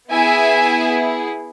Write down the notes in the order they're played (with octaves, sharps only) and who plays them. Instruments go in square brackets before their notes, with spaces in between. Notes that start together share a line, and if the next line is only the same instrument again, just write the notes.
[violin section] B3 E4 G#4 E5 G#5